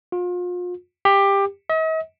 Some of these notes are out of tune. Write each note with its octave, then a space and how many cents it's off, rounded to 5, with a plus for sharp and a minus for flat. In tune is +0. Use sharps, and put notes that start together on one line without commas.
F4 +35
G4 +15
D#5 +45